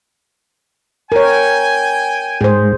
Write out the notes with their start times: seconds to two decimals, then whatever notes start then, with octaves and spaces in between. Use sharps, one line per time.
1.12 A#4 C#5 G5 G#5
2.41 G#2 G#4 C5